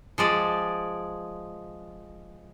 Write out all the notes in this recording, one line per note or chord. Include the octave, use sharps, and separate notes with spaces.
F3 G#3 D5